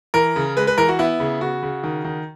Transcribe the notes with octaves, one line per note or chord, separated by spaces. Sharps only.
E3 A#4
C#3
G#3 B4
B4
E3 A#4
F#4
B3 E4
C#3
C#3 F#4
C#3
D#3
D#3